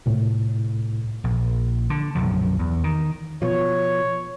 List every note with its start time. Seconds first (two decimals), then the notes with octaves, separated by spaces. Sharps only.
0.06 C2 A2
1.24 A#1
1.90 D3
2.15 B1 F#2 A#2 F3
2.59 E2
2.84 D#3
3.42 B2 F3 C#5